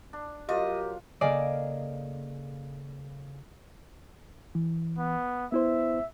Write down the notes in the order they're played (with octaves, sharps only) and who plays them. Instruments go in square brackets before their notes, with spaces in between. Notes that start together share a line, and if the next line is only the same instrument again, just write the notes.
[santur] D4
[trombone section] F#3 A#4 [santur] F4 [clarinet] G4 [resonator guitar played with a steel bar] D#5
[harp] C#3 A#3 A4 [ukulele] G#4 D5 D#5
[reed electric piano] E3
[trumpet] B3
[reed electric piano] B3 E4 C5 [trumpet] E5